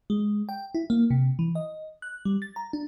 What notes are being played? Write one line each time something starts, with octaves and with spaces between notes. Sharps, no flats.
G#3
G5
E4
A#3
C3
E3
D#5
F#6
G3
A6
A#5
D4